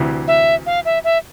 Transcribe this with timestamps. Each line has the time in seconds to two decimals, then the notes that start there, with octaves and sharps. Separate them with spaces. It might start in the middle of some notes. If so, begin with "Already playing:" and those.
Already playing: D2 C3 E3
0.28 E5
0.66 F5
0.85 E5
1.04 E5